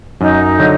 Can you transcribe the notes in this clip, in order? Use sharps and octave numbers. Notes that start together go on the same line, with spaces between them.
F#2 D#4
D3 F#3